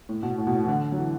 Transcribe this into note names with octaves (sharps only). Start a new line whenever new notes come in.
A2
B2
A2
B2
A2
E3
D3
F#3
E3